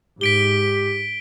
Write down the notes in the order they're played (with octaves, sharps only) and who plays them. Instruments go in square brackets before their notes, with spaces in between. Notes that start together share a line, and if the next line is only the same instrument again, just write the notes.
[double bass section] G#2 [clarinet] G4 [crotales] B6 D7 G7